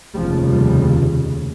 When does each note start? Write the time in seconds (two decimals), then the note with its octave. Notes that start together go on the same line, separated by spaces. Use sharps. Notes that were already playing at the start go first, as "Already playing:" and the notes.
0.15 F1 D#2 C#3 F3 G3
0.44 F3 G3